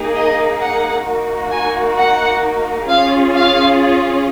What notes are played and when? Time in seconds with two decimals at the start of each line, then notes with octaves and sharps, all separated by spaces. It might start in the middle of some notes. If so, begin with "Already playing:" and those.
Already playing: A#3 D#4 G#4
0.15 D#5
0.61 F#5
1.06 A#3 D#4 F#4
1.51 G#5
1.97 F#5
2.88 C#4 F4 G#4 F5
3.34 F5